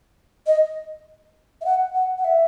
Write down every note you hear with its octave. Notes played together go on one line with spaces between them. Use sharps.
D#5
E5
F#5
F#5
F#5
E5